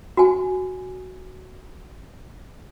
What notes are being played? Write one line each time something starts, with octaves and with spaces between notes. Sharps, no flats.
F#4 G#5